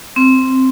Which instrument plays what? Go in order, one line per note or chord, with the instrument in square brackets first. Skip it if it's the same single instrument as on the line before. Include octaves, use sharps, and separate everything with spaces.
[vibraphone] C4